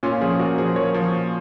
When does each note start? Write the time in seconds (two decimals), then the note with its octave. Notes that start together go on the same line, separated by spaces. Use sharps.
0.03 A#2 C#4 F4
0.21 F3 F4 G#4
0.39 A#2 F#4 A#4
0.58 F3 G#4 C5
0.76 F3 A#4 C#5
0.94 F3
1.12 A#2